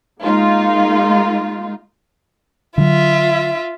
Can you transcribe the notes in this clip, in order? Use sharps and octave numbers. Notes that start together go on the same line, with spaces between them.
G#3 A#3 D#4 F4
D3 F#3 F4 E5